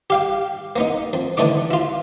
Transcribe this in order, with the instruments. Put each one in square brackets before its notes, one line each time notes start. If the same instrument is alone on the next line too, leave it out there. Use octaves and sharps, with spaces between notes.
[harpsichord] G4 F5 G5
A#3 B3 D#4
F2
D3 E3 A3 D#4 D6
E4 F4